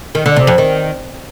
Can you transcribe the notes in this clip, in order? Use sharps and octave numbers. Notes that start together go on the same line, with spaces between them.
D#3
D3
C3
F2
D#3